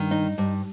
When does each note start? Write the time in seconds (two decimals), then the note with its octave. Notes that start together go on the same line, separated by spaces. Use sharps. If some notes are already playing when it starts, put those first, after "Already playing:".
Already playing: G2 D#3
0.11 D#4
0.38 G2